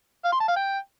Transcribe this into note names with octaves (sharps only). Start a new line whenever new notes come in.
F5
C6
A5
F5
G5